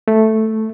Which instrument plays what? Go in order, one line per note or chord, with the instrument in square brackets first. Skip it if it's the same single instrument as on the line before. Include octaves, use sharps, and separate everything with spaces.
[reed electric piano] A3